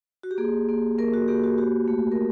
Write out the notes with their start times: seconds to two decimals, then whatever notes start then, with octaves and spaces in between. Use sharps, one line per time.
0.23 F#4
0.31 G4
0.38 A#3 G#4
0.69 A#3
0.98 A#3 A#4
1.14 F#4
1.28 A#3 G4
1.44 F#4
1.58 F#4 G4
1.88 A3
2.12 A#4